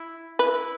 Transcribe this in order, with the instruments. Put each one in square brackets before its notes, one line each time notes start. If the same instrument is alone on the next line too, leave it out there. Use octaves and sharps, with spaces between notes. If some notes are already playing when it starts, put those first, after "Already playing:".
Already playing: [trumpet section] E4
[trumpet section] E4 [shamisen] B4